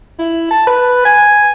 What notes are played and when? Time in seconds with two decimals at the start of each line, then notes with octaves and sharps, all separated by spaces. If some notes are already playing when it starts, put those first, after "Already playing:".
0.19 E4
0.50 A5
0.67 B4
1.05 G#5